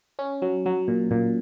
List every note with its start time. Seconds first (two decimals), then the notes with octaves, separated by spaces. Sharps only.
0.19 C#4
0.42 F#3
0.66 F#3
0.88 A#2
1.11 A#2